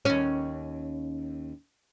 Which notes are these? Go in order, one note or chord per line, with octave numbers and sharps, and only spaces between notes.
D#2 C#4